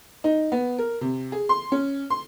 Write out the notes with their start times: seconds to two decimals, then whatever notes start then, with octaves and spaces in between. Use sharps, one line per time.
0.24 D#4
0.52 B3
0.78 A#4
1.01 C3
1.32 G#4
1.49 C6
1.72 C#4
2.10 C6